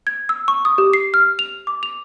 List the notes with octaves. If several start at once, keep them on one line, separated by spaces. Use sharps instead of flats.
G#6
E6
C#6
D#6
G4
C7
F6
F7
D6
F7